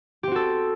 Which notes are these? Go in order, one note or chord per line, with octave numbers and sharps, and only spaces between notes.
C4 F#4 G4 A4